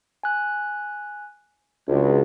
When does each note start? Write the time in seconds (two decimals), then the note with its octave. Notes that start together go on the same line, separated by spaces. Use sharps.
0.23 G#5 F#6
1.88 C#2 D4 F#4